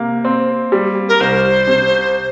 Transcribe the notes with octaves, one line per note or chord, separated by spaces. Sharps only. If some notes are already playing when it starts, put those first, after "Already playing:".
Already playing: C3 A#3
C4
G3
A#4
C2 C5
C3